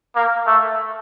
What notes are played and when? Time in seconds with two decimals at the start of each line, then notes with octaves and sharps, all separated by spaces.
0.16 A#3
0.47 A3